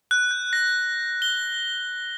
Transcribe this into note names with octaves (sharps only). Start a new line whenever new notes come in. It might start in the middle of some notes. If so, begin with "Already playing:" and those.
F#6
G6
A#6
G7